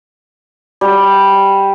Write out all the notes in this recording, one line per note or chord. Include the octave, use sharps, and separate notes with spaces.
G3